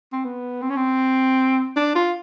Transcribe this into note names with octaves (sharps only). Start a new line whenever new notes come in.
C4
B3
C4
C#4
C4
D4
F4